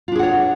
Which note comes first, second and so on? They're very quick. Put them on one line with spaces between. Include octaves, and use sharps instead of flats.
F4 D4 G#4 F#5 C#5